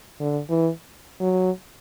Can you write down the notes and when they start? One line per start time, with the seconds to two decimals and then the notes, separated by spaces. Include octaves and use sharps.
0.20 D3
0.49 E3
1.20 F#3